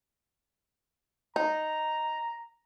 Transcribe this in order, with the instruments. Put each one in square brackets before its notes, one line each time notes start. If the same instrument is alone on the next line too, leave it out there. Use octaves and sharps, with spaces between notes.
[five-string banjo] D#4 [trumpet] A#5